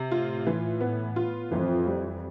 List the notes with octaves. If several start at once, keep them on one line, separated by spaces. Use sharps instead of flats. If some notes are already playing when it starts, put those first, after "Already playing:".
Already playing: C3
A2 F4
E3
B3
F4
F2 E3
G3